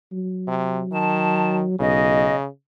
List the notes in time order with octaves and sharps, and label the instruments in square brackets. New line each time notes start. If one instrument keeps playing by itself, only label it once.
[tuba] F#3
[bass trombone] C3
[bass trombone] D#3 [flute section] A5
[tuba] B1 [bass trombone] C#3 [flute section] D#5